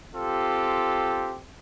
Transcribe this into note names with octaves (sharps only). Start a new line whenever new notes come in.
C4 F4 G4 A4